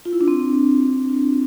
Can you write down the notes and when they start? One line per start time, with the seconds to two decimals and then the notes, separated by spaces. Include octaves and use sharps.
0.05 F4
0.13 E4
0.21 D4
0.28 C4